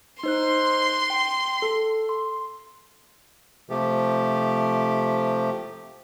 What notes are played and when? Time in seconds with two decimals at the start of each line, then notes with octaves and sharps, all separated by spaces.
0.23 D#4 C5 C6 F#6
1.10 G5
1.62 A4
2.09 C6
3.70 C3 F3 A3 G4